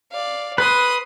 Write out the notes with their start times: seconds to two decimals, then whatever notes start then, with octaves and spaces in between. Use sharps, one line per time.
0.11 D5 F5
0.58 B4 C6 D#6